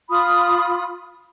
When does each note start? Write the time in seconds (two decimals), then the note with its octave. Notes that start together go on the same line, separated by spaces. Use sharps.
0.10 F4 B5 D#6